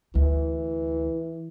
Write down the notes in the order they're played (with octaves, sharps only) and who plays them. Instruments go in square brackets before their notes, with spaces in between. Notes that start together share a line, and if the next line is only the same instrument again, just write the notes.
[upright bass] D2 [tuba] E3